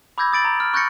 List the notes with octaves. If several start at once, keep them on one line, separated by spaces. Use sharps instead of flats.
B5 D6 E6 G6 G#6 A#6
D#6 A6 D7 F#7
A#5
F6
C#6 F#6 G6 A6 A#6 C#7